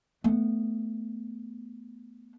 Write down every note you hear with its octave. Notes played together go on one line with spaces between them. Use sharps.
A3 B3